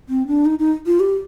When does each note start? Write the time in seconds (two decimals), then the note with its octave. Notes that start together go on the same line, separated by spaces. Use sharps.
0.09 C4
0.27 D4
0.46 D#4
0.59 D#4
0.86 F4
1.00 G4